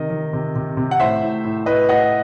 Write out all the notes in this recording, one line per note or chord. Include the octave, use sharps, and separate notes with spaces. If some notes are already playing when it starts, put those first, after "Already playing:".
Already playing: C3 D#3 D#5
D#3
C3
C3
C3
F#5
A2 C5 E5
A2
A2
A2 B4 D#5
A2 D#5 F#5